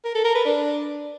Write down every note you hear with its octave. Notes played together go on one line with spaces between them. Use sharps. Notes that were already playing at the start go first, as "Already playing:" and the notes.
A#4
A4
A#4
B4
D4